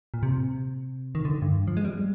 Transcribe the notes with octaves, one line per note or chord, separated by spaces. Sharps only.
A#2
C3
D#3
D3
G2
F3
G#3
G3